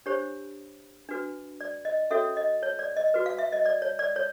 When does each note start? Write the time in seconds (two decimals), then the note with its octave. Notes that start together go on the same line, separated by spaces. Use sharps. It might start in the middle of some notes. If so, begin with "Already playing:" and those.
0.06 D4 G4 C5 C#5
1.09 D4 F#4 B4
1.61 D5
1.85 D#5
2.11 C#4 F#4 A4 C#5 E5
2.37 D#5
2.63 C#5
2.79 D5
2.97 D#5
3.14 F#4 B4
3.26 F5
3.38 E5
3.52 D#5
3.66 D5
3.82 C#5
3.99 D5
4.16 C#5